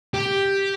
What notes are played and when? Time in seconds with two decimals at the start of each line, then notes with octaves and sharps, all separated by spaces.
0.14 G4